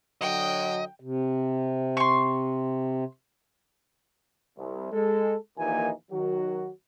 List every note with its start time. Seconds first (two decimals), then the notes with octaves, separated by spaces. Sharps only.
0.21 D3 F#3 D#5 G5
1.00 C3
1.97 C6 C#6
4.57 C2
4.92 G#3 A4
5.58 A#1 D#2 A#2 E3 D#4 G#5
6.11 D#3 F#3 F#4